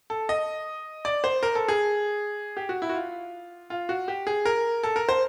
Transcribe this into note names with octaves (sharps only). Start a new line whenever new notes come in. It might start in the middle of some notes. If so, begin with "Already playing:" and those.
A4
D#5
D5
C5
A#4
A4
G#4
G4
F#4
E4
F#4
F4
F4
F#4
G4
G#4
A#4
A4
A#4
C5